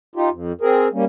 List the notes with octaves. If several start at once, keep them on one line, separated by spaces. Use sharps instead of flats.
D#4 F4 G4
F2
C4 G#4 A#4
G3 A#3 C#4